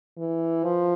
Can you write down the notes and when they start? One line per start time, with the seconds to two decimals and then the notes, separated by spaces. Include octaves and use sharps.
0.17 E3
0.64 F3